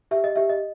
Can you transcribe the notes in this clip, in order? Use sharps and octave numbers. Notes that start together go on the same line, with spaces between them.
G4 E5
D#5
G4 E5
D#5